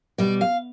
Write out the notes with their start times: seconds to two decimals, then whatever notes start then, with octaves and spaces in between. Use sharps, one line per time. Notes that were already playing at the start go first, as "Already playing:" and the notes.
0.18 B2 G3 D5
0.41 F5